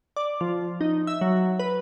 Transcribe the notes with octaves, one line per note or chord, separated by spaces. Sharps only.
D5
F3
D#4
E5
F#3
B4